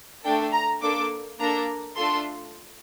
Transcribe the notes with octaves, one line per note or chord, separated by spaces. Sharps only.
A3 D4 A4 G5
A#5
A#3 D4 A4 D6
A#3 D4 A4 A#5
A3 D4 F4 A4 C6